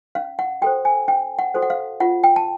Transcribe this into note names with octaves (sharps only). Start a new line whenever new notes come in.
C#4 F5
F#5
F#4 A4 C5 G5
G#5
C#4 G5
F#5
F#4 A4 C5
F#5
F5
F4 F#5
G5
A5